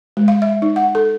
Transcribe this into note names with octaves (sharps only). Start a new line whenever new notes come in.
G#3
F5
E5
D#4
F#5
A4